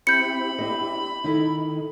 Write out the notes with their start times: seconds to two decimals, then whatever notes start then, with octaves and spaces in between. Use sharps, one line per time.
0.07 C4 E4 G4 B5 G6 C#7
0.59 C4 D4 E4 G4 D#5
1.24 D#3 D#4 E4 A4